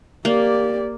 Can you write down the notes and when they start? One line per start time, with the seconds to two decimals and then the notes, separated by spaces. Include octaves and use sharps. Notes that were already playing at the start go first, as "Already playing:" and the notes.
0.25 A#3 G4 D5